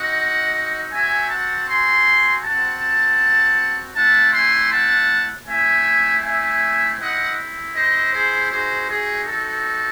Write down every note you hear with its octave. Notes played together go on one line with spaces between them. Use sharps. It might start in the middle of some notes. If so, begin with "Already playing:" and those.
Already playing: C4 D#4 F#4 D#5 F#5
C4 F#4 E5 G#5
F#5 A5
G#5 C6
C4 F#4 F#5 A5
A3 C4 E4 F#5 A5
G#5 C6
F#5 A5
A3 C4 E4 E5 G#5
E5 G#5
C4 E4 D#5 F#5
C5 D#5
G#4 C5
C4 D#4 F#4 G#4 C5
G#4
A4